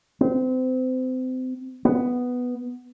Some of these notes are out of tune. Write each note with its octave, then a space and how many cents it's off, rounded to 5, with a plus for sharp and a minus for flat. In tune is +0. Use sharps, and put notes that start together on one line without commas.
C4 -30
B3 +0